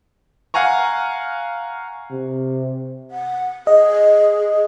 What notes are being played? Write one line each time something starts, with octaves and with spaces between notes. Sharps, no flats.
F5 F#5 G#5 A#5 C#6
C3
F#5
G#4 D#5